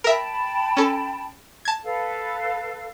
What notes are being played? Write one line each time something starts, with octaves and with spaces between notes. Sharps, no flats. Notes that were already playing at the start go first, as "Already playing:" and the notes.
A#4 E5 G5 A5 B5
C#4 A4
A5 G#6
A4 B4 F5